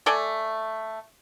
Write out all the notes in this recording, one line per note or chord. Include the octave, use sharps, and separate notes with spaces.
A3 A4 D5 G#5